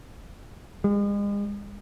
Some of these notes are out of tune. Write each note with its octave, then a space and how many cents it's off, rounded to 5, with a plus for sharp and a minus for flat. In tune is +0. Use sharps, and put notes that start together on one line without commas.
G#3 -40